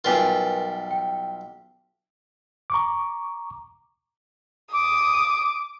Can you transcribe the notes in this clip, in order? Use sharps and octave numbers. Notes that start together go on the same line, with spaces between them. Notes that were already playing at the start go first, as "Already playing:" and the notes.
B1 G3 F4 A#4 B4 G#5
G5
A#5 C#6 D6
D6 D#6